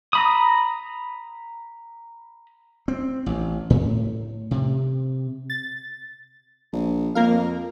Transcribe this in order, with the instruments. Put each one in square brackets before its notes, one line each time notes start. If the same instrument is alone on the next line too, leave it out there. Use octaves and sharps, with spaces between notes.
[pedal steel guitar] A#5 B5 D#6
[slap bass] C4
A1
A2
C3
[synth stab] A6
[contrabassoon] A#1
[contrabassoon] F2 [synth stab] A#3 A#4 F5